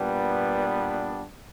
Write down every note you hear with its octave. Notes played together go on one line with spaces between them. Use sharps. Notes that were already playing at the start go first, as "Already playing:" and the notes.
Already playing: A#2 G3 B3 D4